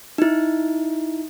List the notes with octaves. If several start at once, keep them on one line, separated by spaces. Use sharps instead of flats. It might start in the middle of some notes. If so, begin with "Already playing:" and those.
D#4 E4